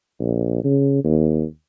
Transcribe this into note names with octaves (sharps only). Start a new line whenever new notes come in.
A#1
C#3
D#2